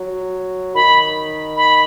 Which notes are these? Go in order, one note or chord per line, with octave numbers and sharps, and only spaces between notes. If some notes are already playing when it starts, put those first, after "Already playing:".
Already playing: F#3
D#3 B5
B5